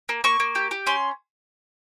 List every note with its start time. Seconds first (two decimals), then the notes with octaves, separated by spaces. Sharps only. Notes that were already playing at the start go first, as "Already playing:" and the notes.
0.09 A#3
0.24 A#3 C#6
0.40 A#3
0.55 G4
0.71 G4
0.87 C#4 C6